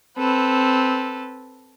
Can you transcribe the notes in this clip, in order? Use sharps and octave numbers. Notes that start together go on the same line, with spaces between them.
C4 A4 B4